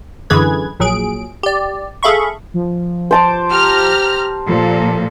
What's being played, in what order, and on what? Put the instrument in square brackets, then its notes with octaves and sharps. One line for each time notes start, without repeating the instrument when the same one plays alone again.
[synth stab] F#2 D3 E3 G#4 B4 G#6
A#1 A#2 F#3 G#4 D7
G4 D5
G#4 A4 E5 F5 B5 C#6
[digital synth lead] F3
[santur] C5 A5 D6
[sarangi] G4 [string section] A#5 F6
[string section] A#2 [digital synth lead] F3 [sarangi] A4